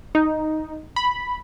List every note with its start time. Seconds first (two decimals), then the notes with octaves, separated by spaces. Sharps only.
0.15 D#4
0.96 B5